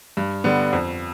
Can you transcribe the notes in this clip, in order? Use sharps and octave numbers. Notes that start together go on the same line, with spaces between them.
G2
D3 G3 B3
F2